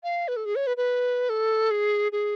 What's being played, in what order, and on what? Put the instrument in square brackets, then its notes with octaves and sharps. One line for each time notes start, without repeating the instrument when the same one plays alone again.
[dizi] F5
B4
A4
G#4
C#5
B4
B4
A4
G#4
G#4